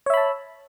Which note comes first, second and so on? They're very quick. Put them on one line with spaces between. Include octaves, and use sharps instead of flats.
C#5 E5 B5 A5